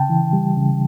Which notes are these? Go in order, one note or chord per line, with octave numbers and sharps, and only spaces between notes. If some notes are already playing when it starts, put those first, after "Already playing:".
Already playing: C#3 G5 A5
E3
G3
C#3